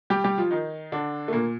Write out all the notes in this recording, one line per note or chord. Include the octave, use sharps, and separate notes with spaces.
G3 G4
G3 G4
F3 F4
D#3 D#4
D3 D4
A3
A#2 A#3